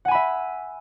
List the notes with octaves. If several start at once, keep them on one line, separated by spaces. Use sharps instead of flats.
E5 F#5 G#5 B5